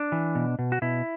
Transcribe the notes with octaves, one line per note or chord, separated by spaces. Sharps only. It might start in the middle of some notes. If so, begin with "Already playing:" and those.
Already playing: D4
E3
B2
B2
F#4
B2 E4